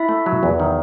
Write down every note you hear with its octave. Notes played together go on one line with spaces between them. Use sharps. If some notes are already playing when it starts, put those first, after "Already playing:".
Already playing: E4 E5
A3
F#3
E2
D#3